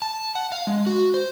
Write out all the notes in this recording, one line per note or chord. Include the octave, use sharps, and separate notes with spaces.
A5
F#5
F5
G#3
F#4
C5